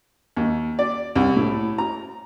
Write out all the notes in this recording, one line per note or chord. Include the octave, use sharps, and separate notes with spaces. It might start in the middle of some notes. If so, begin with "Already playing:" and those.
D#2
D5
C2
A2
A#5